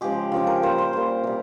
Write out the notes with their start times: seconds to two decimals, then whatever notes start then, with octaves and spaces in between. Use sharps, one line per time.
0.01 C#3 F3 G#3 G4
0.32 C#3 F3 G#3
0.47 A#4
0.62 A#2 G3 C5
0.78 C5
0.93 A#2 G3 C5
1.24 C3 G3